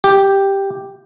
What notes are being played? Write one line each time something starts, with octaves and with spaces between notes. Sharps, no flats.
G4